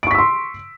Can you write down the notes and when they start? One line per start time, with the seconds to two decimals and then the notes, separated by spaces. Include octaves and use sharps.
0.03 D7
0.07 C#6
0.11 B6
0.15 E6
0.18 C6